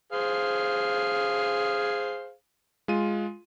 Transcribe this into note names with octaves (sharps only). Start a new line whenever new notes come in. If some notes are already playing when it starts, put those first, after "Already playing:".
G#4 C5 F5
G#3 F4 D#7